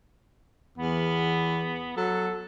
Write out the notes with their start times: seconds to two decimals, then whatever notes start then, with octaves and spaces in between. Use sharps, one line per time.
0.78 E2 B3
1.97 F#3 A4